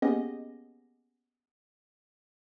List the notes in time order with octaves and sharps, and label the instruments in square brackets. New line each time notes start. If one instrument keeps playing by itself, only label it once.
[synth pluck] A#3 B3 C#4 G4 G#4 D#5